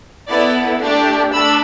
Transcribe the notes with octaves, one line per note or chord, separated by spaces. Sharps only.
B3 E4 A4 D5
A3 D4 G4
A3 D4 B5 E6